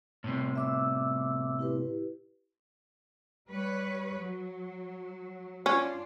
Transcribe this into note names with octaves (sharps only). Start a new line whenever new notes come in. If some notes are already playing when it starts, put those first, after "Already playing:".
A2 C3
E5 D6 E6
E4 G4 B4
G3 B4 C#5
F#3
C#4 D4 F4 D5